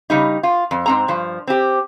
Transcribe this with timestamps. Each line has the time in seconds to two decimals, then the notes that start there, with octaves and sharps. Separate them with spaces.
0.10 C#3 G3 D#4
0.43 F4
0.71 F2
0.86 G#2 C4 A#5
1.08 G2 F3
1.47 C4 G4